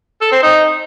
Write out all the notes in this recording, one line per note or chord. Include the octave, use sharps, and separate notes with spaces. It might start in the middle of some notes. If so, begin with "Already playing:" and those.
A4
C4
D#4